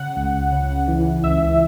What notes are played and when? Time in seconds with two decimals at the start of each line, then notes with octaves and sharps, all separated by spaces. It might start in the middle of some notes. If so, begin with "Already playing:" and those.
Already playing: C#3 F#5
0.16 C#2
0.52 C#3
0.88 E3
1.23 C#2 E5